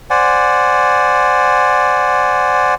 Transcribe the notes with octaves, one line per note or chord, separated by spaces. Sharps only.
C5 D5 F#5 G#5